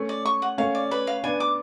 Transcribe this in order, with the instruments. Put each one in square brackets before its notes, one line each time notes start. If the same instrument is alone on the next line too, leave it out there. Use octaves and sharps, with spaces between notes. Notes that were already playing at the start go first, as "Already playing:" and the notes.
Already playing: [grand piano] A3 C#4
[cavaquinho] D5
C#6
F#5
[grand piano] A3 C#4 [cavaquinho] F5
[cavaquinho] D5
B4
F5
[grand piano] B3 D4 [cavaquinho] G#5
[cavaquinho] D6